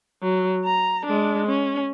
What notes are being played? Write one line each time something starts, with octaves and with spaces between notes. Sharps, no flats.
F#3
A#5
G#3 D4
C#4